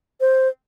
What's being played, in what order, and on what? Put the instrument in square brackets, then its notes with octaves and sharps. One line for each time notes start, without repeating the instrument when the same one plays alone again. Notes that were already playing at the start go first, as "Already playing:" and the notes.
[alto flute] C5